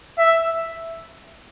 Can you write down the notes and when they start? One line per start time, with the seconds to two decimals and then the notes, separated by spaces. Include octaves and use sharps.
0.18 E5